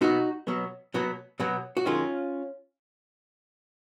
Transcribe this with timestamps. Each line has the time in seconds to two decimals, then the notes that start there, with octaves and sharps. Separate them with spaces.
0.01 B2 F#3 B3 D#4 F#4
0.47 B2 F#3 B3
0.94 B2 F#3 B3
1.40 B2 F#3 B3
1.77 F#4
1.85 F#2 D#3 G#3 C#4 F4